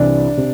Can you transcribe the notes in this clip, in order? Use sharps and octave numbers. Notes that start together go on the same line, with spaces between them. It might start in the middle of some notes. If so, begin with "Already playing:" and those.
Already playing: C2 C3 E3 D4
C3